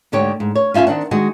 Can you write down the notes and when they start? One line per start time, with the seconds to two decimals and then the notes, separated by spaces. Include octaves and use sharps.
0.12 D2 G#2 D3 G4 C#5
0.40 G#2
0.55 C#5
0.74 C#4 F4 E5 G5 G#5
0.87 D#3 C4 D4 F#5
1.11 D#3 G#3 F#4 D#5 G#5